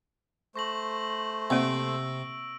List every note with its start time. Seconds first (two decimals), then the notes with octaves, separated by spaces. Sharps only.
0.56 A3 C5 C#6 A#6 F#7
1.50 C3 A#3 C4 E6 D7